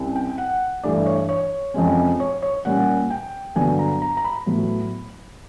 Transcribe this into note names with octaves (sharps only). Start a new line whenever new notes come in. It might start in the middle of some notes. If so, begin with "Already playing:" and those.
Already playing: C2 C#4
G5
F#5
G2 E3 A3 D5
C#5
C#5
F2 C3 F3 G#3 C#4
C#5
C#5
A#2 G3 A#3 C#4 F#5
G5
G2 D3 F#3 B3 G#5
A#5
A#5
A#5
B5
A2 F#3 B3